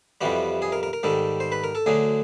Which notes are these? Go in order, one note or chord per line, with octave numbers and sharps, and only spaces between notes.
F2 C3 E3 G3 F#4
G#4
A#4
A#4
A#4
G#2 D#3 G3 A4
C5
B4
A#4
A4
D2 D3 F#3 G#4